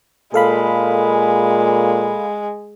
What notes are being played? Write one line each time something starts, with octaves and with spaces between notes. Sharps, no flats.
A#2 G#3 A4 F5 B5